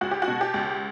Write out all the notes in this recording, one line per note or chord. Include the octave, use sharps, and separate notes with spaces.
C#2 F#4
G4
F#4
B2
G4
C#2